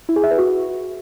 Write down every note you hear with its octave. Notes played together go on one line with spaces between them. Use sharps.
E4
G#4
E5
B4
F#4